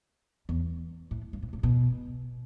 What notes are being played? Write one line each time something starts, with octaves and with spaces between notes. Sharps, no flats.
E2
A2
G2
A2
A2
B2